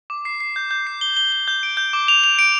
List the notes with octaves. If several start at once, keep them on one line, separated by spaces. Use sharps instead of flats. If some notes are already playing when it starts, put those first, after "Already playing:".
D6
C7
C7
G6
G6
C7
G7
G7
G7
G6
D7
G6
D6
F7
F7
D7